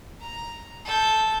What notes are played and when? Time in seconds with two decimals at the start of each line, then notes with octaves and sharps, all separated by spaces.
0.21 A#5
0.85 A4 G6